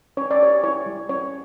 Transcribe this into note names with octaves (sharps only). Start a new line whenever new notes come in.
C#4 C#5
D5
G4 C#5
E4 C#5
G3
C#4 C#5